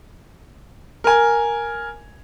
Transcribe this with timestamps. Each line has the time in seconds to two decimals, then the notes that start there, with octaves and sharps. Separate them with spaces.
1.04 A#4 G#5